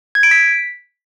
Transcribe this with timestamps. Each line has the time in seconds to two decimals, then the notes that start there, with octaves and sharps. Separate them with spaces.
0.15 G#6
0.23 D7
0.31 B6